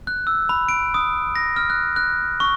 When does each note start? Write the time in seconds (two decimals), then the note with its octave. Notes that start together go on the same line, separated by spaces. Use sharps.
0.07 F#6
0.27 E6
0.49 B5
0.69 D7
0.94 D#6
1.36 A#6
1.56 F6
1.70 F#6
1.96 F#6
2.40 C#6